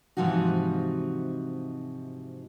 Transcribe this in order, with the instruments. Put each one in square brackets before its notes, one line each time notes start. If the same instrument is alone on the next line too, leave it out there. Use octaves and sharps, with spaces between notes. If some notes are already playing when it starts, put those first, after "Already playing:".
[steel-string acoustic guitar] G#2 C3 E3 F3 D#4 F#4